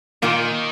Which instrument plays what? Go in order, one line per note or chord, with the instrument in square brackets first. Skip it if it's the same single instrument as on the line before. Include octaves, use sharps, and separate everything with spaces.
[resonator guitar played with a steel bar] A#2 A#3 F4 [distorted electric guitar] D#3